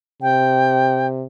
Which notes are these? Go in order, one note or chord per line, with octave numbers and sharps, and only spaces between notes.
C3 G5